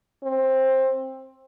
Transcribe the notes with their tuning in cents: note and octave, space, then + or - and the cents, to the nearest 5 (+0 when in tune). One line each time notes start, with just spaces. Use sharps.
C4 +15